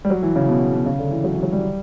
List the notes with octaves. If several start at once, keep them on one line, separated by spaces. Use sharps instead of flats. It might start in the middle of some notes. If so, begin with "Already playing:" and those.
G3
F#3
E3
C#3
B2
B2
C#3
D3
E3
F#3
E3
F#3
G3